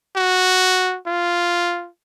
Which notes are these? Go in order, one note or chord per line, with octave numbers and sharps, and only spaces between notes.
F#4
F4